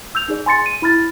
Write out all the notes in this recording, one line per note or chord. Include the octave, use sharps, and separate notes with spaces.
E6 G6 F7
D#4 G#4 D5
G#5 C6 A6 C#7
D#7
E4 B5 F6 A6